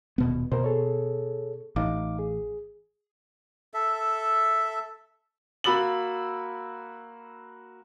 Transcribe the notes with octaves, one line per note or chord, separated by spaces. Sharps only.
D#1 B2 B3
B2 A#3 A#4 C5
G#4 A4 C#5
A1 D#4 F5 D6
G#4
A4 E5
A#3 F#4 B5 E6 A6 F#7